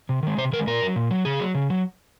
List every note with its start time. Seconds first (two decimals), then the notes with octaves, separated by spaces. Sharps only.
0.09 C3
0.23 D#3 G#3
0.38 C3 C5
0.53 D#3 G#3 A#4
0.67 A#2 A#4
0.82 F#3
0.96 A#2
1.11 F#3
1.25 C#3 G#4
1.40 F#3
1.55 C#3
1.70 F#3